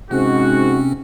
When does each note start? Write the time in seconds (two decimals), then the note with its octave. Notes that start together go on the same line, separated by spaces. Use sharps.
0.11 G#2 C3 C4 C#4 F#4